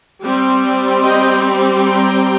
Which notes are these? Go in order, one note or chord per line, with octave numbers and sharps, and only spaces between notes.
G3 C4
D#5 G5
G5 A#5